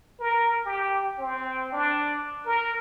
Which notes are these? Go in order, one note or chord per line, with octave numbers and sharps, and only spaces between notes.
A#4
G4
C4
D4
A#4